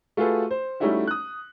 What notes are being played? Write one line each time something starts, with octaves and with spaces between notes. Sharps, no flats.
A3 F4 F#4 G#4 A4 B4
C5
G3 A3 C#4 D#4 E4 F#4
D#6 F#6